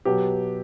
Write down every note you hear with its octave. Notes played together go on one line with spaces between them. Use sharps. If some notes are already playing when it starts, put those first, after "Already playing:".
B2 F#3 G4